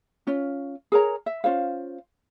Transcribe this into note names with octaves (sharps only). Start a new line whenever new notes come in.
C#4 F4
G#4 A#4 C#5 A#5
E5
C#4 F4 C5 F5